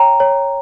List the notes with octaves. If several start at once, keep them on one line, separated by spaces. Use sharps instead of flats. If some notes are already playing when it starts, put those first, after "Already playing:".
Already playing: C#5 G5 A#5
C#5